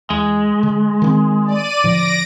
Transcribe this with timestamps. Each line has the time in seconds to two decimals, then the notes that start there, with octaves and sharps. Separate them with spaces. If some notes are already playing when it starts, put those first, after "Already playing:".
0.10 E2 G#3
0.63 D3
1.02 D#3 B3 C4
1.46 D5 D#7
1.84 A2 D3 F3 A#6 D7